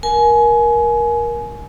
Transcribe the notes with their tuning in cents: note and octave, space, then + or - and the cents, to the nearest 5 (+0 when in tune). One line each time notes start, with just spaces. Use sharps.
A#4 +20 G#5 +25